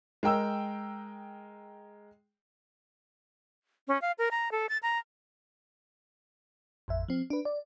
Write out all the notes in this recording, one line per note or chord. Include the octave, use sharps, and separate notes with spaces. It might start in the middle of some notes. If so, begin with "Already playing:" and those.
G#3 A#4 G5 E6
C#4
F5
A#4
A#5
A4
A6
A#5
A1 F2 E5
F3 C4
D4 B4
D5